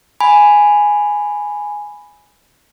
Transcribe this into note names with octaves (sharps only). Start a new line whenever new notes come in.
G#5 B5